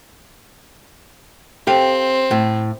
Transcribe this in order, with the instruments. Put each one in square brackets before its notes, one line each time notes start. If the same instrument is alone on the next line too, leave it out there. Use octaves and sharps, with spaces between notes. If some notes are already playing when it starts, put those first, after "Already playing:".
[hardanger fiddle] C4 [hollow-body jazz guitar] G4 A4 F5
[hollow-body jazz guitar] A2